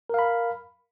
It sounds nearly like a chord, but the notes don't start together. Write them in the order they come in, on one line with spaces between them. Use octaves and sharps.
A#4 F5 B5